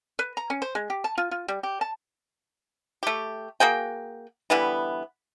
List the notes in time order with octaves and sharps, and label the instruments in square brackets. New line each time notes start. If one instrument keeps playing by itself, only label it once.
[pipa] B4
A#5
C#4
C5
G#3
G4
A5
F4
F4
G3
G4
A5
A3 G4
A#3 F#4 G#4 G5
D3 E3 G3 B3